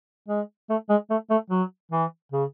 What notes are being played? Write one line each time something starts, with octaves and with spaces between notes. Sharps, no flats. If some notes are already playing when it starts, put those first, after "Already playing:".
G#3
A3
G#3
A3
A3
F#3
E3
C#3